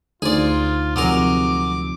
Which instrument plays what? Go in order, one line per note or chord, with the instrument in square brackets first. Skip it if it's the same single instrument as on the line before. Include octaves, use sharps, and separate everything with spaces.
[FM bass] D2 [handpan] D#4 C5 [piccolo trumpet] F4 [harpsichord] G#4 D5
[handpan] C3 F3 [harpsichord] F#3 G#3 A#4 [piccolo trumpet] D6